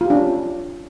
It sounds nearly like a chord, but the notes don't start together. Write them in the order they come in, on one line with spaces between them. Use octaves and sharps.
F4 G4 D4 C#4